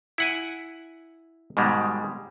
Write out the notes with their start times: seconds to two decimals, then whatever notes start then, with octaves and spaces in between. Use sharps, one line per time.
0.18 E4 F#5 G#5
1.57 G#2 B2 D#3 G3 G#3